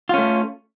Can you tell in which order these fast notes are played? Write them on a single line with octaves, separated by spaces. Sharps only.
F4 C#4 A3